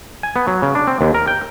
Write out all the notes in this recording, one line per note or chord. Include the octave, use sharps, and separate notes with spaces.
G#5
B3
F#3
C#3
D4
C4
D#2
A#4
G5